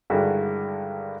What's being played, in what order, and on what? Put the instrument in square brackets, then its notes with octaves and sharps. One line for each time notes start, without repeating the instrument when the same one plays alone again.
[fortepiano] G2 D3 D#3 G#3 E4 F#4